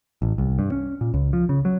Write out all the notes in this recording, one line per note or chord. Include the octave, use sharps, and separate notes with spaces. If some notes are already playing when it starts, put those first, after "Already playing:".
A1
C2
G2
C#4
A#2
C#2
F3
C#3
F#3